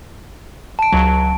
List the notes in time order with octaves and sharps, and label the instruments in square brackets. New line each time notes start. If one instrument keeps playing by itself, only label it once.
[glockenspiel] A5 D7
[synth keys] C#2 F#3